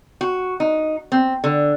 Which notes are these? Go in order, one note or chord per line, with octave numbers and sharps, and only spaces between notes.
F#4
D#4
C4
D3